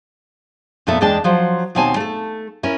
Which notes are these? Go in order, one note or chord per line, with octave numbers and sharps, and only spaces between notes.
F2 A#2 A3 B3 A4 E5
E2 G#3 D4 G5 A5
F3 F#3 C5
D#2 B2 C4 C#5 G#5 A5
A3 A4
C#4 E4 A#4